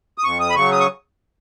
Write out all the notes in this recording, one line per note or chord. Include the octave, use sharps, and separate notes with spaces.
D#6
F2 C#6
D#6
B5
C#3 F#3 C#6
D#6
C#6